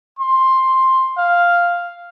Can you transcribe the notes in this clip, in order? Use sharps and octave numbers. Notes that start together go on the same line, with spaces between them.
C6
F5